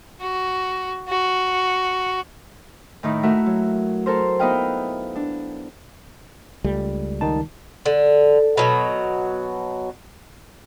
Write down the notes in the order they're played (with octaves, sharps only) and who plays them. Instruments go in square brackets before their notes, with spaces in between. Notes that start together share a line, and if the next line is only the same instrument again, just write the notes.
[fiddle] F#4
F#4
[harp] A2 D#3 D#4 E4
A3 F#4 A#4 E5 F#5
F#3
A4 A#4 C5
B3 D#4 E4 D#5 F5 G5
D4
[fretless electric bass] C#2 G3 A3
[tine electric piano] D#3 D#4 A5
[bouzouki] D3
B2 F#3